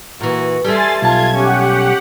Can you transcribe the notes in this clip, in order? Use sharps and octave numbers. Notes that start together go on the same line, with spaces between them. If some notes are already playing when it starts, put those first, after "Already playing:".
A#2 E3 F#4
G3 A3 A4 G#5 C6 A6
B1 F4 A5 G#6
C#4 G4 F#5